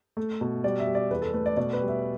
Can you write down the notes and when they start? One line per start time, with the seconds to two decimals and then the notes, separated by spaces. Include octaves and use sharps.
0.17 A3
0.41 B2
0.64 G3 D5
0.80 E5
0.87 G3
0.95 D5
1.11 E2 B4
1.22 A4
1.33 A3 B4
1.46 D5
1.57 B2 D5
1.73 B4
1.81 G3
1.88 E5